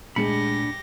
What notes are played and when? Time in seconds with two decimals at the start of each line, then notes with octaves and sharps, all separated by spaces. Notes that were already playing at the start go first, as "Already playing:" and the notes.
0.16 A#2 G#3 A3 D4 G4 B5 A#6 C#7